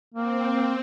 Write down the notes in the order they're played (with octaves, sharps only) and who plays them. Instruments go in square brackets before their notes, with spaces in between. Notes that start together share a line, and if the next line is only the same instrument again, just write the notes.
[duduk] A#3 [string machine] C4